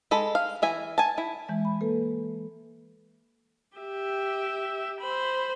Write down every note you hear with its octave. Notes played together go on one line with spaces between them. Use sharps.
G#3 A4 B5
F5
E3 E5 G#5
G#5 A5
E4
E3 G#3 E5
B5
A#3 A4 B4
G4 E5
C5 B5